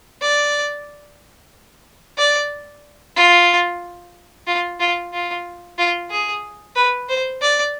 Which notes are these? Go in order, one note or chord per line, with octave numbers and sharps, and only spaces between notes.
D5
D5
F4
F4
F4
F4
F4
G#4
B4
C5
D5